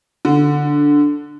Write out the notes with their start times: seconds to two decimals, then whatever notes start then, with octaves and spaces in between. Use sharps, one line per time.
0.25 D3